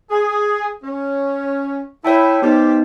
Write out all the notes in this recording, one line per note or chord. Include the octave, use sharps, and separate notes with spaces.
G#4
C#4
E4 C#5 G5 A5
B3 D#4 G4 C5